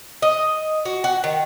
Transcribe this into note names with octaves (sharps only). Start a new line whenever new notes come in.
D#5
F#4
F#4
D#3